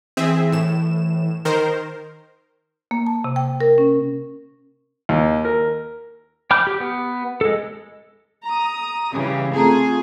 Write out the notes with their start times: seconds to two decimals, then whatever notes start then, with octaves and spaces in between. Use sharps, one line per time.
0.17 E3 C4 G#4 E5
0.52 A2 E7
1.45 D#3 A#4 C5
2.91 A#3
3.07 A5
3.24 C3
3.36 G5
3.61 A#4
3.78 C#4
5.09 D#2
5.45 A#4
6.51 G5 B5 D6 F6 G6
6.67 G4
6.80 B3
7.41 G#3 A4
8.44 A#5 D#6
9.13 C#3 E3 G3
9.55 A3 C4 F4 G#4 A5 A#5